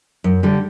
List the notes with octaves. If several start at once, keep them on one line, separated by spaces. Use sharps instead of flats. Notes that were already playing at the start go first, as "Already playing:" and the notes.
F#2
D3 G3